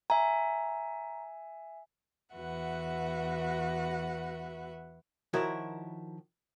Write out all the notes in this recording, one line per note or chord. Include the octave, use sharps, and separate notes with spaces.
E5 G#5 A#5
E2 F#4 B4 E5 F#5
D#3 F3 E4 F#4 A#4 C#5